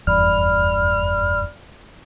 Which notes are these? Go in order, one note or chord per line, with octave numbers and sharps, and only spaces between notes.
F1 E2 G2 D5 B5 F6